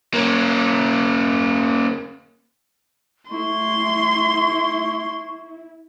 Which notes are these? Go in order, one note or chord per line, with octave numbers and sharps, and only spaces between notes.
A#3 C#4
A3 E4 C6 C#6